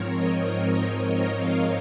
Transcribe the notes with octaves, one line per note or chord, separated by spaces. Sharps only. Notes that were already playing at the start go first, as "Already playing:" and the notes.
Already playing: G#2 F3 C4 A#4 C#5
D#5
D#5
D#5
F5